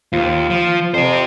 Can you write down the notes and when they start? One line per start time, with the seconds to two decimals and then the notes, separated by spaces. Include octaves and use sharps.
0.13 D#2 F4
0.50 F3
0.94 F2 G4 C5